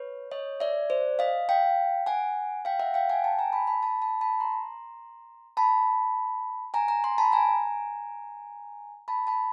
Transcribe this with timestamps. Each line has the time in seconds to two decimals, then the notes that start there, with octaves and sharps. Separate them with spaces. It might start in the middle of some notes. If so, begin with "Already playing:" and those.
Already playing: B4 C#5
0.31 C#5 D#5
0.60 D5 E5
0.90 C5 D5
1.19 D#5 F5
1.49 F5 G5
2.06 F#5 G#5
2.65 F5 G5
2.80 E5 F#5
2.94 F5 G5
3.09 F#5 G#5
3.24 G5 A5
3.39 G#5 A#5
3.52 A5 B5
3.67 A5 B5
3.83 A5 B5
4.02 A5 B5
4.21 A5 B5
4.40 A#5 C6
5.57 A5 B5
6.74 G#5 A#5
6.88 G#5 A#5
7.04 A#5 C6
7.18 A5 B5
7.33 G#5 A#5
9.08 A5 B5
9.27 A5 B5